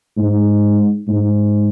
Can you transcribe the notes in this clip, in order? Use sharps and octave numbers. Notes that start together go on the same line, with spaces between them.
G#2
G#2